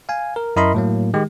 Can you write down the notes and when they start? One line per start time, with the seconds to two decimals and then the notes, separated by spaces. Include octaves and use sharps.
0.09 F5 G#5
0.36 A#4
0.56 F#2 E4 A#4 D#5 B5 C6
0.74 A2 F#3 A#3
1.14 D#3 G#3 G4